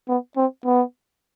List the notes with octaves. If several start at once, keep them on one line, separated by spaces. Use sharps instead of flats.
B3
C4
B3